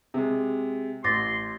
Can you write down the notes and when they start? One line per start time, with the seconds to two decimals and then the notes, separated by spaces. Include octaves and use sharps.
0.14 C3 G#3
1.04 A1 C6 D6 A6 A#6